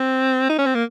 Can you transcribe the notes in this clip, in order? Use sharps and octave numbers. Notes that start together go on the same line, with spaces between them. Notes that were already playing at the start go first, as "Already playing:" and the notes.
Already playing: C4
D#4
C#4
C4
A#3